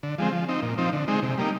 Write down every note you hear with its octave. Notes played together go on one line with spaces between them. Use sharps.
D3
F3 G#3 C4
F3
C4 D#4
A#2
F3 C4 D#4
D3
G#3 C4 D#4
C3
G3 A#3 D#4